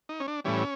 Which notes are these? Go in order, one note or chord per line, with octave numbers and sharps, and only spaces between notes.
D#4
C#4
D4
A2 E3 G3 C#4